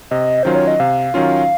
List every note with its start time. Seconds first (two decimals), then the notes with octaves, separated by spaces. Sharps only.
0.11 C3 D#5
0.43 D#3 F#3 C#4 F4 C5
0.55 C#5
0.67 D#5
0.80 C3 F5
1.14 D#3 F#3 C#4 F4